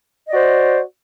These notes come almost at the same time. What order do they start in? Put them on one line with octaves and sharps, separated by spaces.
D#5 D5 F#4 C5